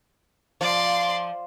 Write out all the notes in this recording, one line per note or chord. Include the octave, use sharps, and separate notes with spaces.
F3 D5 C6